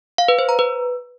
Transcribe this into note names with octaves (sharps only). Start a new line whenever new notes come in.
F5
B4
C5
A#5
B4